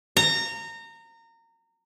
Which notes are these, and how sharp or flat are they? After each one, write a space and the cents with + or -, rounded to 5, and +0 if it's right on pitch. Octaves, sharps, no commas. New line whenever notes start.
A#5 -25